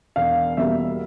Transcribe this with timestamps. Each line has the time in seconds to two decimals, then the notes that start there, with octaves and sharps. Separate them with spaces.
0.16 E1 F5
0.57 E2 B2 G3 A#3 E5